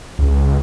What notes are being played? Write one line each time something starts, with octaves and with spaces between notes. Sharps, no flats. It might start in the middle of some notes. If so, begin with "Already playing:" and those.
C#2